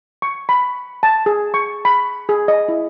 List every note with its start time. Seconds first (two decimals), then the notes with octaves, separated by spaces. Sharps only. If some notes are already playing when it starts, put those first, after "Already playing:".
0.22 C#6
0.49 B5
1.03 A5
1.26 G#4
1.54 C#6
1.85 B5
2.29 G#4
2.48 D#5
2.69 E4